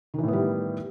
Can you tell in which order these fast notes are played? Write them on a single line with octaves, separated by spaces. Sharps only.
D#3 E3 A2 B3 G3